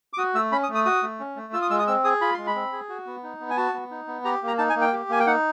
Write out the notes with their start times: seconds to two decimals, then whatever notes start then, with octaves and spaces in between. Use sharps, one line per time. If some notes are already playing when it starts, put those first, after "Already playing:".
0.13 D6
0.18 F#4 D#6
0.34 A3 E6
0.52 C#4 B5
0.63 D#6
0.69 A3
0.75 D#6
0.85 F#4 D#6
1.03 A3
1.20 C#4
1.36 A3
1.53 F4 E6
1.62 D#6
1.70 G#3 E6
1.79 D#6
1.87 C4 E6
2.04 G#4 D#6
2.21 F4 B5
2.34 G#3 C6
2.47 B5
2.55 C4
2.72 G#4
2.89 F#4
3.06 B3
3.23 D#4
3.40 B3
3.50 G#5
3.57 F#4 A5
3.74 B3
3.91 D#4
4.07 B3
4.25 G4 A#5
4.42 A#3
4.48 A#5
4.58 D#4 A5
4.70 G#5
4.76 A#3
4.81 G5
4.93 G4
5.09 A#3 G#5
5.20 G5
5.27 D#4 F#5